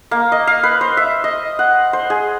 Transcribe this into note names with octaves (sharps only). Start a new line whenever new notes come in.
A#3
D#5
F5
B4
C5
E5
D#5
F#5
C5
G#4